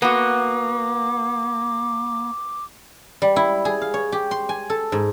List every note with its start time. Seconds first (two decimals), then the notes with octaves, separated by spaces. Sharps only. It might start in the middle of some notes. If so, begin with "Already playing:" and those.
0.02 A#3 B3 F#4 D6
3.22 G3
3.36 E4
3.65 G#4
3.82 F5
3.94 C#5
4.12 G4
4.31 C6
4.49 G#5
4.70 A4
4.92 G#2